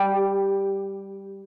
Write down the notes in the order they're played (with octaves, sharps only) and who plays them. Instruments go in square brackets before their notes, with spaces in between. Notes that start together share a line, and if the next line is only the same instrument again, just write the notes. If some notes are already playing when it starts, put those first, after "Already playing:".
Already playing: [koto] G3 G4